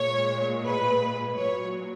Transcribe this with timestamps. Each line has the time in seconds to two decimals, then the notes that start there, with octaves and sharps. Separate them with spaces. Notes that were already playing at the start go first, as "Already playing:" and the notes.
Already playing: A#2 G#3 C#5
0.65 B4
1.39 A#2 F#3 C#5